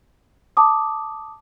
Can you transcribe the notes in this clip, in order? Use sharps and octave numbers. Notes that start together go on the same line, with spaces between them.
A5 D6 D#6